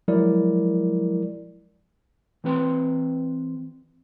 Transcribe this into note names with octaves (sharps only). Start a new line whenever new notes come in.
F3 F#3 G#3 E4 A#4 D5
E3 C4 B4 G5 C6